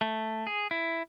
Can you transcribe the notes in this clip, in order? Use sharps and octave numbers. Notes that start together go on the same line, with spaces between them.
A3
G#4
E4